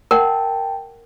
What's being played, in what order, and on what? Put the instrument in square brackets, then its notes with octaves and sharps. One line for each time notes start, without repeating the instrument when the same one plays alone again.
[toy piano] A#4 F#5 [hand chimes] G5 A5